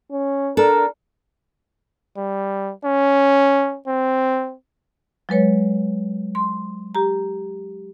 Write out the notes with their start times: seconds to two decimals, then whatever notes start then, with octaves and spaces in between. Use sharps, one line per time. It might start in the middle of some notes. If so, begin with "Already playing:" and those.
0.11 C#4
0.57 D4 A4 A#4
2.17 G3
2.85 C#4
3.87 C4
5.29 F#3 G#3 B4 C#5
6.35 C6
6.95 G4 A#5